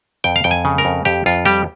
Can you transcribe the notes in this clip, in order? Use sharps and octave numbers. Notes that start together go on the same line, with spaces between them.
F2 G5
F5
F2 G5
G#5
C#3
A#4
F2
F2 G4
F2 F4
G3 G4